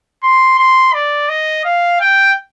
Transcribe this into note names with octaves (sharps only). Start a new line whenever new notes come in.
C6
C6
D5
D#5
F5
G5